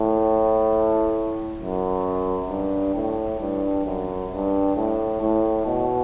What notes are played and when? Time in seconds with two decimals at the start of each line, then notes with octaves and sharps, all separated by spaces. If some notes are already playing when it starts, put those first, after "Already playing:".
Already playing: A2
1.60 F#2
2.49 G2
2.95 A2
3.40 G2
3.85 F#2
4.32 G2
4.76 A2
5.21 A2
5.66 B2